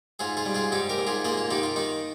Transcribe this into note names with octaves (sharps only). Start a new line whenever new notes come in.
G#2 F4 G#4
F4 G#4
G3
F4 G#4
G#2 D#4 G4
G4 A#4
G#2
F4 G#4
A#3 F4 G#4
F4
D#3 D#4 G4
F4
D#3 D#4